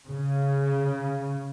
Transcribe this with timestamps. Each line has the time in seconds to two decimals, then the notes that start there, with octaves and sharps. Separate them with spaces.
0.11 C#3